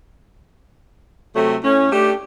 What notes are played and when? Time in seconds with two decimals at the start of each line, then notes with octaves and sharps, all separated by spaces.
1.35 C3 F#3 A3
1.63 A2 C#4
1.92 A3 D4 G4